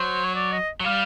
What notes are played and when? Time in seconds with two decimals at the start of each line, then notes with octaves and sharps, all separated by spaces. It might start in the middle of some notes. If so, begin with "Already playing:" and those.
Already playing: F#3 C5
0.24 C#5
0.36 D5
0.52 D#5
0.81 F#3
0.85 G3 F5